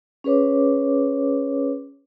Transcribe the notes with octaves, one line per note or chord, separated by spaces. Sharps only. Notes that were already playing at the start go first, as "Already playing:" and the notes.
C#4 G#4 B4 C#5 D6